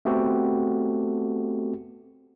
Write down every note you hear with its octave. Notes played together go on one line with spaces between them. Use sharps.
A3 B3 C4 F#4 G4 A4